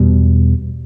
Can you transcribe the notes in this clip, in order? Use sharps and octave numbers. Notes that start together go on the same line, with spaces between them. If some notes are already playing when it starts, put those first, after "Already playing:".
Already playing: E2 B2 G3